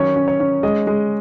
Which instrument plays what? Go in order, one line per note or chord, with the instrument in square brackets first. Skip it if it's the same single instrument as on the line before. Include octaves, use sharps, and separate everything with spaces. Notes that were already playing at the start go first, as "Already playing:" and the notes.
Already playing: [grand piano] D#3 F#3 C#4 C#5
C#4
C#5
C#4
G#3 D#5
G#3